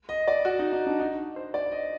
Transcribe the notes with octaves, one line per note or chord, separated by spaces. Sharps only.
D#5
D5
F#4
D#4
D#4
D4
D#4
C5
D5
D#5